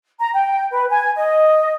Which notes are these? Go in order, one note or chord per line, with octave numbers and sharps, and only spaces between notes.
A#5
G5
B4
G#5
D#5